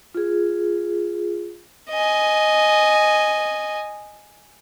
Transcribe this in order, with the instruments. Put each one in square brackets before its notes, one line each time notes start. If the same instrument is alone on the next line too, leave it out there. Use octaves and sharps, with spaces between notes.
[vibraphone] F4 G#4
[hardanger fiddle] D#5 G#5